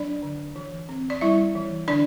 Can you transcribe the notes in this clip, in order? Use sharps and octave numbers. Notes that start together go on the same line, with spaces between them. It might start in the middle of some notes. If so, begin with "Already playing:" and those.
Already playing: F#3 D4 D5
D3
E3
C4
D5
G3 E4 E5
E3
D3 D4 D5